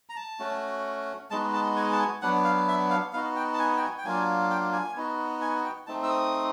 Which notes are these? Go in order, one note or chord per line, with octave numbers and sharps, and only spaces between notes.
A#5
A5
A3 C#4 F#4
G#3 B3 D#4 F#4 A5
A5
G#5
A5
G#5
F#3 B3 D4 F#5
F5
E5
F5
B3 D#4 F#4 F5
G5
A5
G#5
G5
G#5
G5
F#3 A#3 D4 F4 G#5
G5
G#5
B3 D#4 F#4
G#5
G5
A3 C4 D#4 A5
E6
D#6